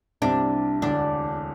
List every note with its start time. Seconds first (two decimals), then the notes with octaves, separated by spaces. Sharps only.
0.22 C2 C3 G3 C4 D4 E4
0.82 E1 D2 D3 D4